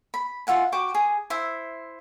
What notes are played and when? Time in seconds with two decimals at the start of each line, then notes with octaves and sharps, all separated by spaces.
0.14 B5
0.47 F4 E5 F#5 G#5
0.72 F#4 G5 D6
0.95 G#4
1.30 E4 C5 E5